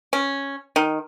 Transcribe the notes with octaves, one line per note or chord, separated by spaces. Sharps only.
C#4
D#3